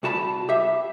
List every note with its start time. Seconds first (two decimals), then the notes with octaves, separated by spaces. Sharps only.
0.03 C2 F#4 A5 B5
0.49 G4 E5